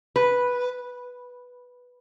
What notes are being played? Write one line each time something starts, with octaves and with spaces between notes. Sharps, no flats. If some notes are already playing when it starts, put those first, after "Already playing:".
B4